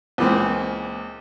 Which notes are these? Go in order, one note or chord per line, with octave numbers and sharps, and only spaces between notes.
C#2 A#2 E3 A#3 C4